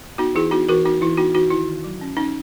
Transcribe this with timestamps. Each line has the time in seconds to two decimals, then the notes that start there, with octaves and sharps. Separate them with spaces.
0.18 B3 D#4 F#4
0.35 E3 E4 G#4
0.51 B3 D#4 F#4
0.69 E3 F#4 A#4
0.85 B3 D#4 F#4
1.01 E3 E4
1.17 B3 D#4 F#4
1.35 E3 D#4 F#4
1.51 D#3 E4
1.67 D#3
1.84 F#3
2.01 C#4
2.17 C#4 D#4